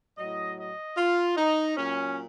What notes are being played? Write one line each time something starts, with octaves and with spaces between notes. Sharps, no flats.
A2 F#3 D#5
D#5
F4
D#4
A#2 F#3 C#4